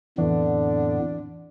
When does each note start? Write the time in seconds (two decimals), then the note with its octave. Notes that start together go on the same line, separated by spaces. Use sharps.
0.18 F2 A2 D3 E3 B3 D4